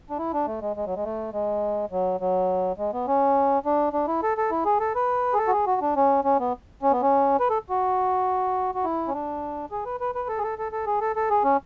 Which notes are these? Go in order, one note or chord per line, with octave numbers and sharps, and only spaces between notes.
D4
E4
D4
A3
G#3
G#3
F#3
G#3
A3
G#3
F#3
F#3
G#3
B3
C#4
D4
D4
E4
A4
A4
E4
G#4
A4
B4
G#4
A4
F#4
G#4
F#4
D4
C#4
C#4
B3
C#4
B3
C#4
B4
A4
F#4
F#4
E4
C#4
D4
G#4
B4
B4
B4
A4
G#4
A4
A4
A4
G#4
A4
A4
G#4
C#4